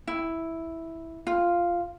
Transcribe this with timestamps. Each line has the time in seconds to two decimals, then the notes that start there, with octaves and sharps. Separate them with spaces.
0.07 E4
1.27 F4